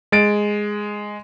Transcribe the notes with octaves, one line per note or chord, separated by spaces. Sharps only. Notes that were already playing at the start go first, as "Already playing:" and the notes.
G#3 A6 D7